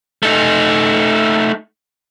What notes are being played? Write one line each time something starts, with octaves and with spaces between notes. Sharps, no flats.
A3 D#4